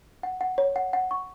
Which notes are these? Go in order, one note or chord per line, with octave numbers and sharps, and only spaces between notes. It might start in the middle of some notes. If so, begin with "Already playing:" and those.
F#5
F#5
C#5
F#5
F#5
C#6